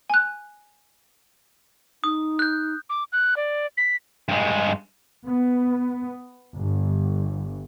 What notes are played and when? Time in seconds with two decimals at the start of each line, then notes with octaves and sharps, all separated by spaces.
0.10 G#5 F#6
2.04 D#4 D#6
2.39 F#6 G6
2.89 D6
3.12 F#6
3.36 D5
3.77 B6
4.29 G2 G#3
5.26 B3
6.60 G1